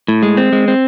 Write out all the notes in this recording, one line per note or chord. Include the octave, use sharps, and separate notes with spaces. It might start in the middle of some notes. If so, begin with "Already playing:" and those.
A2
G#3
C4
G#3
C4